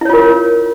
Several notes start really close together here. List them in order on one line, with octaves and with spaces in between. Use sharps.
E4 C#5 F4 A#4